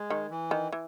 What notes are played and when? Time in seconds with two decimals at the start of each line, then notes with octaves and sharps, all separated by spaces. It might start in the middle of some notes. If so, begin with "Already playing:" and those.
Already playing: G#3
0.10 D#3
0.30 E3
0.51 D#3
0.73 E3